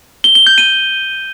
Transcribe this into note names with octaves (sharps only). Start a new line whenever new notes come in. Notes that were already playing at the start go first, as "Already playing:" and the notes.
G7
G7
G6
D#7